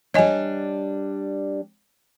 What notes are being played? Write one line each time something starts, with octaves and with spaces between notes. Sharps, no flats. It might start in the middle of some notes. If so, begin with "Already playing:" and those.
G3 D4 C#5 D#5 G#5